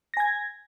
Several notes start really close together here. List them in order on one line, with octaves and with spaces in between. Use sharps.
A#6 G#5 G#6